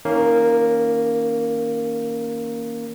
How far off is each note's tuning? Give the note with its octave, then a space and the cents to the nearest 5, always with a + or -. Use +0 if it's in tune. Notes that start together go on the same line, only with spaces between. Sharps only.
D#3 +40 A#3 +0 C#4 +0